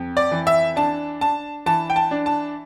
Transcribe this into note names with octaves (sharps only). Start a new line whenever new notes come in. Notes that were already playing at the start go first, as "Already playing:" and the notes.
Already playing: F2
D5
E3
E5
D4 A5
D4 A5
E3 A5
G5
A5
D4
A5